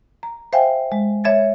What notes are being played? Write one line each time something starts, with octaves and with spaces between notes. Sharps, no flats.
A#5
C5 E5 F5 G5 G#5
G#3
C#5 E5 G#6 A6